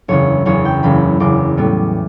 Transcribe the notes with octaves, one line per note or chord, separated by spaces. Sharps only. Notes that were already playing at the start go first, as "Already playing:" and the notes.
F#1 E2 C#3 C#5
F#1 E2 C#3 C#5
G5
F#1 E2 C#3 B5
F#1 E2 C#3 D6
A2 G3 B3